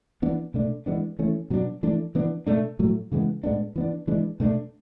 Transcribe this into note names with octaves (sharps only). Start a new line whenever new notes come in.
E3 B3 D4
B2 A3 D4
E3 G#3 B3 D4
E3 A3 C#4
B2 F#3 B3 D4
E3 A3 D4
E3 B3 D4
B2 A3 D4
A2 F#3 A3
C#3 E3 G#3 B3
A2 G#3 B3 D4
E3 B3 D4
E3 G#3 B3 D4
B2 A3 D4